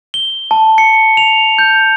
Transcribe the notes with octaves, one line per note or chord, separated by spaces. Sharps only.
G7
A5
C#7
F7
G6